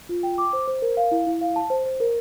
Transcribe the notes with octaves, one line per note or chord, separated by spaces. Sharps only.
F4
G5
D6
C5
C5
A#4
F5
E4
E4
F5
A5
C5
C5
A#4